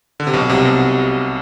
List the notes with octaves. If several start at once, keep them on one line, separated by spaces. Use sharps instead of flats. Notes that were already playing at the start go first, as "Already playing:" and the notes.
D3
C3
B1 B2
C2 C3
B2